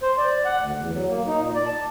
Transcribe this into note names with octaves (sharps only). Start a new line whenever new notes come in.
C5
D5
F#5
D2
E2
F#3
A#3
D#4
A#2
D5
A5